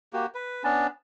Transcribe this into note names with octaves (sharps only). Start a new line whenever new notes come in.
A#3 F#4 G4
B4
B3 C#4 D4 A5